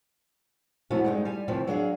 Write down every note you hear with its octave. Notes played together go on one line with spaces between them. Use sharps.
F3 A3 B3 C#4 E4 F#4
G2 G#3 D#4
G3 G#5
F#2 A2 C3 E3 F3
F#3 D4 G#4 F5